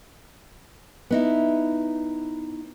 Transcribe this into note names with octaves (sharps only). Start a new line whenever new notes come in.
B3 D#4 E4